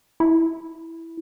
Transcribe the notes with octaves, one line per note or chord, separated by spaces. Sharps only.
E4